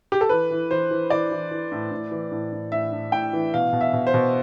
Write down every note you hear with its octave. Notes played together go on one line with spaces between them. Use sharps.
G4
A4
E3 B4
E3
E3 C5
E3
E3 D5
E3
E3
A2
A2
E3
A2
A2
A2 E5
A2
A2 G5
E3
B2 F5
B2
E5
B2
C5
B2